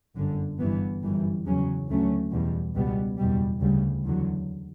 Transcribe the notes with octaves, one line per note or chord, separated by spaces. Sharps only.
G1 F#2 D3
G1 G2 E3 B3
G1 F#2 E3 G3
E2 C#3 F#3 C#4
D2 D3 F#3 A3 C#4
E2 B2 G3
C#2 B2 G3 B3
F#1 E2 B2 G3
D2 C#3 G3
E2 D3 F#3